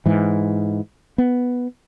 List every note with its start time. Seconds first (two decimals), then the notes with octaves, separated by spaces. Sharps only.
0.06 G#2 E3
1.18 B3